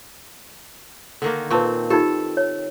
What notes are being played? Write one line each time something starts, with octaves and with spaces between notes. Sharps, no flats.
D3 D#3 A#3
A#2 C4 B4 A5 C#6
D#4 F4 G4 A4
C#5